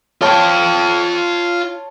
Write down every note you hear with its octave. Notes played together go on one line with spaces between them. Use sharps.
F4 C#5 G5 A5 C6